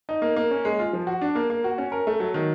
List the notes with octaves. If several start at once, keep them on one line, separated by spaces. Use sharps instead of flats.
D#4
A#3
A#3
C#4
G#3
F4
F3
F#4
D4
A#3
A#3
F#4
C#4
A#4
A3
F#3
D#3